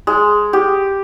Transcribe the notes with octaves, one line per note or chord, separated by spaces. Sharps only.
G#3
G4